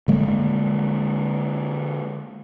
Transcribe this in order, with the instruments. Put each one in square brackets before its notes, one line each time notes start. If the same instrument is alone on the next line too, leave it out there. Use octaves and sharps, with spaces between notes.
[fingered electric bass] D3 G#3 A#3